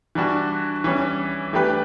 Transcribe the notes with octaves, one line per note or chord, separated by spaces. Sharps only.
E3 G3 D4 F#4
E3 G3 C#4
E3 A3 D4 G4 B4